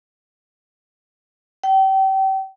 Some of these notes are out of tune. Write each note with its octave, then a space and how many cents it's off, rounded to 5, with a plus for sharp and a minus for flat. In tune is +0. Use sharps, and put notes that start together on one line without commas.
G5 -30